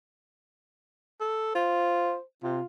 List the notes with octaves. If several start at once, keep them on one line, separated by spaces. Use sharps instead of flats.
A4
F4 C5
C3 F4